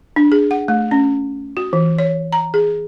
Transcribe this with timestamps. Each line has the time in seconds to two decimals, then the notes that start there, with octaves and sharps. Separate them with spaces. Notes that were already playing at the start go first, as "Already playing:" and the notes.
0.16 D4
0.32 G#4
0.51 F#5
0.68 A3
0.91 C#4
1.57 F#4
1.73 E3
1.99 C#5
2.32 A#5
2.54 G#4